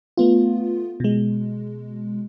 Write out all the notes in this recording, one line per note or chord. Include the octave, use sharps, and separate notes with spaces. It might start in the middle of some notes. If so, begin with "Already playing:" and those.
A3 B3 F4
B2 G#3